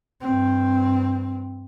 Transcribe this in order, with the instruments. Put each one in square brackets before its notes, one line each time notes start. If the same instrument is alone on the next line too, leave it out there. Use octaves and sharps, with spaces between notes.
[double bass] G2 C4